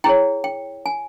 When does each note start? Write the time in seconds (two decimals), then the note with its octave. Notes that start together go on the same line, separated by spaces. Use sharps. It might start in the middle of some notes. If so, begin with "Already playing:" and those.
0.04 E4 G#4 C#5 G5
0.44 G5
0.86 G#5